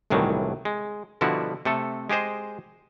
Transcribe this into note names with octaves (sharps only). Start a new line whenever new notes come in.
G1 C2 A2 D#3 E3 F#3
G#3
B2 D3 F3 G3 E4 F#4
C3 A3 A4
G#3 G4 G#4 C5 D#5